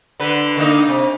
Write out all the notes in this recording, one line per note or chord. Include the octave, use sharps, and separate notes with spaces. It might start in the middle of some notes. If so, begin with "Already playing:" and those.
D3 B4
D3 A#3 D#4
C3